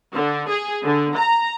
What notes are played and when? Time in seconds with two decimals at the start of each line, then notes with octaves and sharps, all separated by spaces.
0.13 D3
0.50 G#4
0.84 D3
1.16 A#5